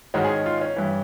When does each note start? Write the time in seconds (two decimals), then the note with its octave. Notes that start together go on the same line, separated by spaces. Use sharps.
0.14 G#2 D#3 G#3 C#4 F#4
0.25 G#4
0.46 F4
0.61 C#4
0.76 G2 E3